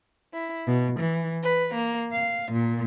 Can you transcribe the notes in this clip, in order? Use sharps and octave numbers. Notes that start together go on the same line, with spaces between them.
E4
B2
E3
B4
A#3
F5
A#2